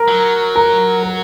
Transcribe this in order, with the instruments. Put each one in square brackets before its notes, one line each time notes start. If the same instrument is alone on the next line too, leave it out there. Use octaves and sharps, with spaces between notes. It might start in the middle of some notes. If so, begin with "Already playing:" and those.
Already playing: [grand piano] A#4
[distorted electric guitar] F#3
[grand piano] A#4
A#4